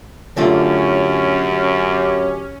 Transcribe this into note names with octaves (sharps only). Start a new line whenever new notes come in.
F#2 D3 A3 C#4 F4 G4